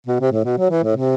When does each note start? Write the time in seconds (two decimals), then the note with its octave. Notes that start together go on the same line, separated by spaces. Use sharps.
0.07 B2
0.20 C3
0.32 A2
0.45 B2
0.58 F#3
0.71 E3
0.83 A2
0.96 C3